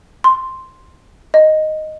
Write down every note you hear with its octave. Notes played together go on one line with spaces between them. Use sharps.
C6
D#5